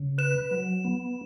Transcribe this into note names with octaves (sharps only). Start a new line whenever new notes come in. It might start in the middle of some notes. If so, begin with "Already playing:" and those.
Already playing: C#3
B4 E7
F#3
B3